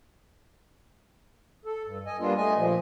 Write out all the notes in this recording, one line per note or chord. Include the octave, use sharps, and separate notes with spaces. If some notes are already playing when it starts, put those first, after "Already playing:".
A4
G2
D#5 G#5
G3 A#3 B3 D4 F4
A3 D#5 G#5
A#2 F3